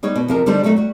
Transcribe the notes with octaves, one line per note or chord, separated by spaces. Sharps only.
G3 B3 D#4 C#5
B2
F2 C3 A#4
D3 G3 D4 D#4 C5
F#3 A3 B3 D#4 F#4
G3 F#4